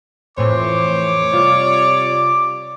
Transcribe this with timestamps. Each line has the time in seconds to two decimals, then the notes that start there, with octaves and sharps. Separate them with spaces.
0.37 F2 A2 E3 C5 C#5 D6
1.33 C3 G3 F4 D5